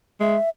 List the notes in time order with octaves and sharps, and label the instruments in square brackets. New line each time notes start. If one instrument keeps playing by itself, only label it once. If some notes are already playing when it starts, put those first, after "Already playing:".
[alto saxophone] G#3 [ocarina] E5